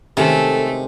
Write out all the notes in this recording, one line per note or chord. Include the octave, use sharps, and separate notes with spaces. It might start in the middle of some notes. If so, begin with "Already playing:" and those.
C3 D#3 G#3 A3 C#4 A4